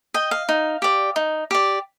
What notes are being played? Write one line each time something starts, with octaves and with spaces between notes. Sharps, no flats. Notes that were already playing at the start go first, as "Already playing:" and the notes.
D#5 G5
F5
D#4
G4 D5
D#4
G4 D5